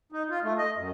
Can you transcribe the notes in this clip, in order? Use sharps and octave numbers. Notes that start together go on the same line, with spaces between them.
D#4
F4
A3
D#5
F#2